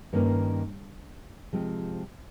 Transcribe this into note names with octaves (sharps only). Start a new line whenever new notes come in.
G2 D#3 A#3 C#4 C#5
C3 F3 G#3 C4